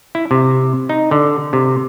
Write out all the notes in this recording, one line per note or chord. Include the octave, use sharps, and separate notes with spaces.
E4
C3
D#4
D3
C3